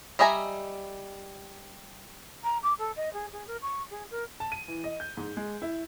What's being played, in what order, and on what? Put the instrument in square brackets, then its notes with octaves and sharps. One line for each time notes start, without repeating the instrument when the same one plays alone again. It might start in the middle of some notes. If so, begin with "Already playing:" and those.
[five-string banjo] G3 D#5 E5 G#5 A#5
[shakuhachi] A#5
D6
A4
D#5
G#4
G#4
A#4
C#6
G#4
A#4
[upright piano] A5
D#7
E3
D#5
G6
G#2
G#3
E4